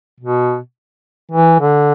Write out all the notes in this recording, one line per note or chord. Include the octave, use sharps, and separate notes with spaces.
B2
E3
D3